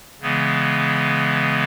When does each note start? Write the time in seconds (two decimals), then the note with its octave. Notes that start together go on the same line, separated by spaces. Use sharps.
0.21 C#3 E3 G#3 B3